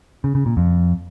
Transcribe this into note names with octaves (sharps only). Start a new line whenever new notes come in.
C#3
C#3
A#2
F2